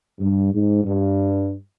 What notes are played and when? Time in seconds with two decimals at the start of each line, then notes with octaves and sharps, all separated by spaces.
0.19 G2
0.53 G#2
0.85 G2